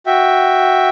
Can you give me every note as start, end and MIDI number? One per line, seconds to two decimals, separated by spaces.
0.06 0.90 66
0.06 0.90 76
0.06 0.90 79